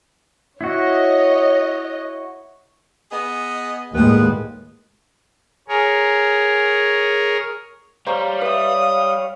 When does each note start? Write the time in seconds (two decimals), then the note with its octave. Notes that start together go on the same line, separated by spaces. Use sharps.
0.61 E4 F#4 C#5 D#5
3.11 B3 G#4 D#5
3.93 D#2 A2 G3 G#3 B3 B4
5.68 G#4 A#4 C#5
8.07 G3 C5 C#5 F5 A#5 C#6
8.41 B4 E5 D#6